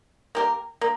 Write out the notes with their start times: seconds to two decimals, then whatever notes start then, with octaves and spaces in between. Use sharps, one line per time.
0.35 A#3 G4 A#4
0.81 A#3